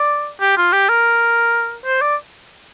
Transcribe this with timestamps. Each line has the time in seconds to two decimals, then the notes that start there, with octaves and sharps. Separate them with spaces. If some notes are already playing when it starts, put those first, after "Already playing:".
Already playing: D5
0.41 G4
0.57 F4
0.72 G4
0.89 A#4
1.86 C5
2.01 D5